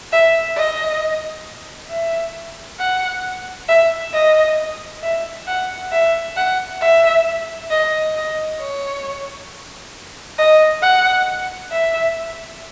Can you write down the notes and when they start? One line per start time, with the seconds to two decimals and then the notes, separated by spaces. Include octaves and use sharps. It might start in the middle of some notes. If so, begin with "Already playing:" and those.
0.12 E5
0.56 D#5
1.90 E5
2.79 F#5
3.68 E5
4.14 D#5
5.03 E5
5.48 F#5
5.92 E5
6.37 F#5
6.81 E5
7.70 D#5
8.15 D#5
8.60 C#5
10.38 D#5
10.82 F#5
11.71 E5